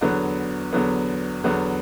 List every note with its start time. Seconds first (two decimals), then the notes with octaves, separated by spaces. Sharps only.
0.01 E2 D3 F#3 B3
0.73 E2 D3 F#3 B3
1.44 E2 D3 F#3 B3